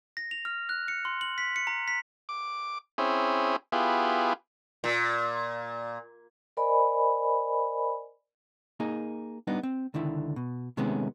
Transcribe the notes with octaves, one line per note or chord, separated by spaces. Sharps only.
A#6
F7
F6
F#6
C#7
C6
F#7
B6
C#7
A#5
B6
D6
C4 C#4 E4 G#4
B3 E4 F4 G4 G#4
A#2
A#4 C5 D5 D#5 G#5 B5
A#3 D#4 G#4
G3 B3 D4 D#4
C4
C#2 D3 D#3 E4
B2
C3 D#3 G#3 A3 B3 C#4